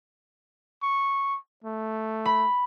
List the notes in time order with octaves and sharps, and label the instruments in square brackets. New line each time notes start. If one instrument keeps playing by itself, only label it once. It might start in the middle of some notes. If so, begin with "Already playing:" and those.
[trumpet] C#6
A3
[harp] B5